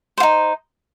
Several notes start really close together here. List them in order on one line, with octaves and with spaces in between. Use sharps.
C5 F4 D#4